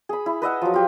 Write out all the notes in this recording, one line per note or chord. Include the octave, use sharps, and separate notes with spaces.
G#4 B5
E4
B4 D#5 E5 F#5
F3 F#3
F4 G4